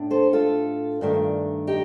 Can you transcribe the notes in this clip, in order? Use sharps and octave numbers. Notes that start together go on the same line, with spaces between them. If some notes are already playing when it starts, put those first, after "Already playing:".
Already playing: A2 D4
A4 C5
F4 A4
G2 D#3 A3 D4
D#4 G4